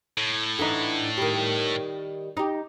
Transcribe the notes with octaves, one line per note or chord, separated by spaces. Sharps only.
A2
D3 E3 D#4
D#3 G3
D#4 G4